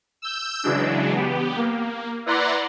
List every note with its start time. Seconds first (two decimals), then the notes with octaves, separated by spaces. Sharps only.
0.22 E6 G6
0.63 C#3 E3 F#3 G#3 D4
1.15 B3 G4
1.56 A#3
2.26 E4 B4 D5 F#5 A#5 C6